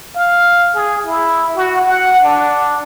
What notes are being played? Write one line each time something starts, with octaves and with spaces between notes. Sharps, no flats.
F5
G#4
E4
F#4
F#5
D4